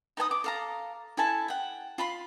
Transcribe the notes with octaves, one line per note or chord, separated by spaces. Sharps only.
D#4 B4 G#5 D#6
D6
A4 F5 A#5
E4 A4 G#5 A5
F#5 G5
F4 B5 C6